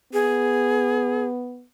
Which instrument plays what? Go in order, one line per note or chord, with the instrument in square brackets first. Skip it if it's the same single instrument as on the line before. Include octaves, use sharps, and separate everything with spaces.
[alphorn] B3 [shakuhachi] G#4